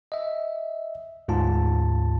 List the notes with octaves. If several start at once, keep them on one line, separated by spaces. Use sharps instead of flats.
D#5 E5
D2 G#2 F4 A5